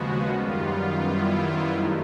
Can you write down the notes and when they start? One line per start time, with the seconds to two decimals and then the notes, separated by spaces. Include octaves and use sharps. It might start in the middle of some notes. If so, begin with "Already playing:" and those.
Already playing: D#2 C#3 F3 G#3 B3 F#4
0.28 F#2 D#3 G3 B3 F4
1.00 E4
1.72 G2 D#3 F#3 A3 D#4